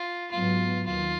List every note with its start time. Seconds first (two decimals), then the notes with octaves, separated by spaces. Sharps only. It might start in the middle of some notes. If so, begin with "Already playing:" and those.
Already playing: F4
0.31 G#2 F#3 B3 F4
0.86 D#2 D#3 F4